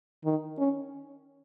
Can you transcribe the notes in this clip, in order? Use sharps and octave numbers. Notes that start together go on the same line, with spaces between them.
D#3
C#4